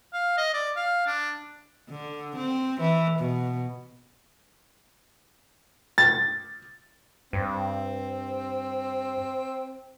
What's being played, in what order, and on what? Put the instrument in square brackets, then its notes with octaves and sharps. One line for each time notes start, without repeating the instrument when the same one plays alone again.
[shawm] F5
D#5
D5
F5
D4
[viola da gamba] D3
C4
E3
B2
[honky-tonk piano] A6
[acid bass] G2 [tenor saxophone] C4